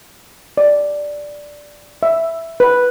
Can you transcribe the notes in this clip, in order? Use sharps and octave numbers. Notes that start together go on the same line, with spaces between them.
D5
E5
B4